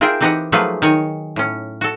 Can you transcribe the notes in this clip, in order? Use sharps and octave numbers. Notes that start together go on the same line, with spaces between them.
F4 G#4 A#4 D#5 E5 G5
E3 C4 D#4 G4 D#5 F#5
F3 F#3 A3 A#3 G#4 B4
D#3 C#5 D#5 G#5
A2 C#4
F#4 A4